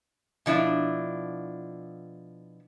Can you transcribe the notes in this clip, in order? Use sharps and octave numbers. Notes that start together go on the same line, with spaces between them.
B2 F3 D4 E4